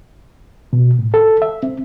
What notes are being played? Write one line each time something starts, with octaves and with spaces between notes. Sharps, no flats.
B2
A2
A4
E5
C4